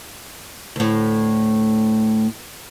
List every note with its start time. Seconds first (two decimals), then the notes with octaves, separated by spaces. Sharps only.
0.76 D2 A2